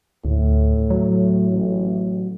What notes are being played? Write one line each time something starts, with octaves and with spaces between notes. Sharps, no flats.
D2 A2
F#3
A1